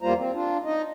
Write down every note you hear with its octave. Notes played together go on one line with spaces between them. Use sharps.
E2 G3 A#3 F4 C5 A#5
C4
D4 F4
D#4 D#5